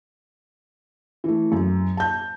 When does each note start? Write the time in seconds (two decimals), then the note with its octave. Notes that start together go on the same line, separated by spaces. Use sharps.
1.24 E3 A3
1.52 F#2
1.97 A5 G6